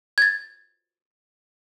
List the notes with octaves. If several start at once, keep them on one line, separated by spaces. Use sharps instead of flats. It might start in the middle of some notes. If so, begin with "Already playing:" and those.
G#6 A6